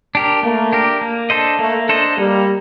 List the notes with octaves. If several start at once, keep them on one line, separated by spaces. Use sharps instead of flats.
D4 G4 A#4
A3 A#3
D4 G4 A#4
A#3
D4 A4 C5 D#5
A3 A#3
D4 A4 C5 D#5
G3 A#3